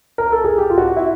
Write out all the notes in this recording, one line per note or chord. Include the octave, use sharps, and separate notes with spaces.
A#4
A4
G#4
G4
F4
F#4
E4